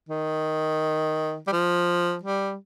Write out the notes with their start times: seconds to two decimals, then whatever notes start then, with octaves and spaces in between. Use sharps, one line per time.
0.09 D#3
1.47 G3
1.52 F3
2.23 G3